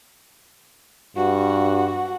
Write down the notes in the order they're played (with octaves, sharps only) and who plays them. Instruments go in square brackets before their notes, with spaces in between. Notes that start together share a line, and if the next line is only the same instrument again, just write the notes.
[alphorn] G2 [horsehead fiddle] F#4